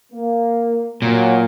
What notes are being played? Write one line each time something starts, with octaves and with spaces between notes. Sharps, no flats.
A#3
A#2 F#3